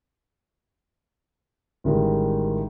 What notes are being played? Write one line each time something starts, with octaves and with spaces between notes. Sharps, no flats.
A1 D#3 G3 G#3